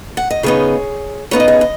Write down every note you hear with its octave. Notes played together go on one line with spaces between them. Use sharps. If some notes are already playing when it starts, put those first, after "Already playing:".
F#5
D#5
C#3 B3 D#4 G#4 C#5
C#3 B3 D#4 C#5
D#5
G#4 C#5
D#5